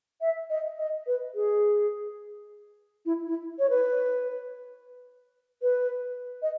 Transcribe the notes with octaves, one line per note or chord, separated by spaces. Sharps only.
E5
D#5
D#5
B4
G#4
E4
E4
C#5
B4
B4
D#5